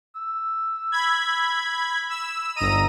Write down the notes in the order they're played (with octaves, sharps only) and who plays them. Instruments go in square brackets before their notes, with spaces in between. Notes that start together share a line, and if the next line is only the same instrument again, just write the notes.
[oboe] E6
[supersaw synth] B5 [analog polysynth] G#6
[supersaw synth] E6
[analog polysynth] G1 D#7 [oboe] D#5 [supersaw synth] A#5